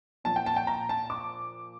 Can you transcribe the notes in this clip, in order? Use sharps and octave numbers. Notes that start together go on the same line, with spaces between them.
A#2 F3 A5
G5
A5
G5
A#5
A5
D6